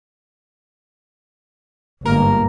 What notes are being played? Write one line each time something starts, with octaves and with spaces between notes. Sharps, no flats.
G1 G#2 A#3 A#4